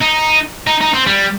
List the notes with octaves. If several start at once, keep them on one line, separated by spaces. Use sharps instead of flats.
D#4
D#4
D#4
C4
G3